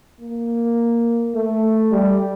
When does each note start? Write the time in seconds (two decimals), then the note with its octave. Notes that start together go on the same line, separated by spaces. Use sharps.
0.21 A#3
1.35 A3
1.91 G3